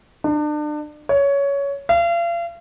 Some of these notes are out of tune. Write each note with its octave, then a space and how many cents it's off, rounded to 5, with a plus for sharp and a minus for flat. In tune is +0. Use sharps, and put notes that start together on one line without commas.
D4 +35
C#5 +15
F5 -40